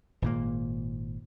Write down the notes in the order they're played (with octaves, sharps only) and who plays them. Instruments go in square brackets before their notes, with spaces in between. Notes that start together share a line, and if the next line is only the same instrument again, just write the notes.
[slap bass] G#1 A#2 A#3